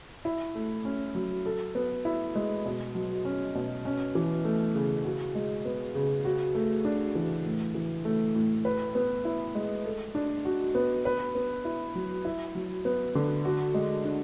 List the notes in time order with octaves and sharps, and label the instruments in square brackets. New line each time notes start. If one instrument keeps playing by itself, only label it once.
[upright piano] E4
A3
C#4
F#3
A4
B3
E4
G#3
B2
F#3
C#4
B2
C#4
E3
A3
C#3
F#4
G#3
B3
C#3
F#4
A3
D4
E3
A2
E3
A3
A2
B4
B3
E4
G#3
A4
D4
F#4
B3
B4
B3
E4
F#3
E4
F#3
B3
D3
F#4
G#3
D4